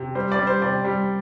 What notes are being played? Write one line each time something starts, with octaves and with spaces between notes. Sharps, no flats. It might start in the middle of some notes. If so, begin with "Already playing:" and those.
Already playing: C3
G3 C5
D5
G3
C5
C3 D5
G3